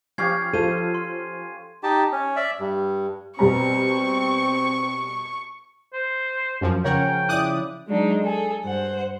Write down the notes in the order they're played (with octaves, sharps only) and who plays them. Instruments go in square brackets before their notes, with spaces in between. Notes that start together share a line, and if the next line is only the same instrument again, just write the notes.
[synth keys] F3 [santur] C#4 G4 F5 [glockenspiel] G#6 C7
[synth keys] F3 F4 C5 [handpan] A4 [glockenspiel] D#7
[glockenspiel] C6
[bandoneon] D#4 G4 A5
C#4
D5 E5
G2
[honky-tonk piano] B2 G3 A#5 [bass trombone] C4 [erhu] C#6
[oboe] C5
[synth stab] F#2 F3
[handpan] C#3 F3 C#4 [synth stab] A#4 C#5 F#5 [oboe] G5
[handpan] E4 D5 [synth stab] D6 D#6 F#6
[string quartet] F#3 G#3 D4 D#4
G#4 A4
G2 C5 F#5